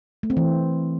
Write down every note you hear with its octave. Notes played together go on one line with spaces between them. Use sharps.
A3
C4
E3